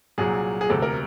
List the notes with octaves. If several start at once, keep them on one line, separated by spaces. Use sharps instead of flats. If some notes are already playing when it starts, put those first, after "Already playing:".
C2 A#2 F#3 G#4
G#4
E1 D2 C3 A4
A#4